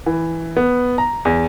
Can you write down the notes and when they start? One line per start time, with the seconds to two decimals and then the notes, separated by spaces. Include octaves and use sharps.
0.06 E3
0.57 B3
0.98 A#5
1.25 E2